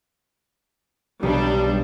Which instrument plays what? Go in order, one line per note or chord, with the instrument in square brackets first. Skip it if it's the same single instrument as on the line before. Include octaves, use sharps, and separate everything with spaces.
[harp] B1 [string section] G3 D4